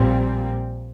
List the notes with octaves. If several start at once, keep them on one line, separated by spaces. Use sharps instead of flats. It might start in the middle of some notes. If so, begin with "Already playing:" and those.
Already playing: A#1 A#2 G3 C4